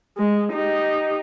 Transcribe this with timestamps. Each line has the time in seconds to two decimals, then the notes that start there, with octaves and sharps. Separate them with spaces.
0.17 G#3
0.53 D#4 G4